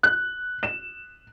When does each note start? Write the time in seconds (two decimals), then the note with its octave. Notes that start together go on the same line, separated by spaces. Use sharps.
0.03 F#6
0.63 E7